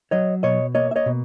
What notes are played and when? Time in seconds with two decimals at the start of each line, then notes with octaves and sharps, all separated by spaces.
0.11 F#3 C#5 D#5
0.43 B2 C#5 D#5
0.75 A#3 C#5 D#5
0.91 E5
0.96 C#5 D#5
1.06 B2